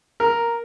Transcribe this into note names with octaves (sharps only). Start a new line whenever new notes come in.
A#4